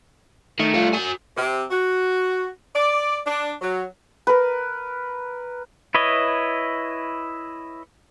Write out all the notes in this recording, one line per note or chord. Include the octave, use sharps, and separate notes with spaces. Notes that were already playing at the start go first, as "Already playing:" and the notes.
D#3 A3
G3 F4
F#4 G#5
C3
F#4
D5
D4
F#3
A#4 B4
E4 B4 C#5 D#5